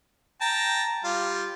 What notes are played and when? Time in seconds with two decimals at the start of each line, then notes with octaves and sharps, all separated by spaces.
0.41 G5 A5 A#5
1.04 G3 F4